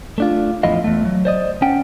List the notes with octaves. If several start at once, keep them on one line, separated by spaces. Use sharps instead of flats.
A3 D4 F4
E2 A2 F3 E4 D#5 F5
E2 A3
F#3
C5 D5 D#5
C#4 F#5 G5